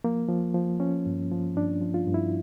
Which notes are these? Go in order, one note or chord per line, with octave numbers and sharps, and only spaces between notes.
F3 A#3
F3
F3
F3 C#4
G2
F3
G2 D4
F3
F4
G2
E4